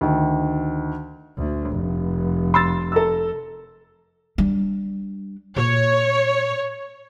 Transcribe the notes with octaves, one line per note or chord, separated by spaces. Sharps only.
D2 D#3
D2
F1
C6 E6 A6
A4 A#5 E6
G3 D4
A#2 C#5